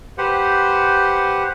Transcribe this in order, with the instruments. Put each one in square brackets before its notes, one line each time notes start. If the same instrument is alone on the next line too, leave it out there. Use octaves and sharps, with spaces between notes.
[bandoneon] G4 B4 C5 F#5